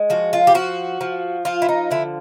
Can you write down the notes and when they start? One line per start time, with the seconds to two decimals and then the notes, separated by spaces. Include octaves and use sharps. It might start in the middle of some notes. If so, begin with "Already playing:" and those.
Already playing: G#3
0.10 F3 F#4
0.33 F4
0.47 G4
0.55 F3 F#4
1.01 F3
1.45 F3 F4
1.62 E4
1.69 D#4
1.91 D3 E4